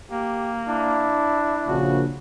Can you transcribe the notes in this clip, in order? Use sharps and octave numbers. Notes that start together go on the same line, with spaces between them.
A#3 G4
D4 E4
A#1 C#3 F#4